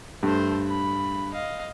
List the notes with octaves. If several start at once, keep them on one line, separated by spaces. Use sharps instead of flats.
G2 A3 C5
B5
D#5 F5